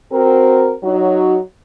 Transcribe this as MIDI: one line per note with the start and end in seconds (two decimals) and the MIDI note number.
0.12 0.73 60
0.12 0.73 66
0.12 0.73 70
0.83 1.37 54
0.83 1.37 63
0.83 1.37 66